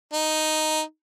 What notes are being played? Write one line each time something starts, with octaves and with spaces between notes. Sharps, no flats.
D#4